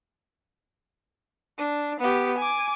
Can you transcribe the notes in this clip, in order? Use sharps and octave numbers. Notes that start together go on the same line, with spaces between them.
D4
B3 G4
G#5 D6